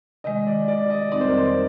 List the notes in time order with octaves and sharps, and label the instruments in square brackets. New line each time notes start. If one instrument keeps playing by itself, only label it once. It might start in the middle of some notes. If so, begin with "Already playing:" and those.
[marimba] C3 D#3 G#3 [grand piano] D#5
[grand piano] D5
D5
D#5
[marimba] F2 D#3 G3 C4 D#4 [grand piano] D5
[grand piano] C5
A#4
C5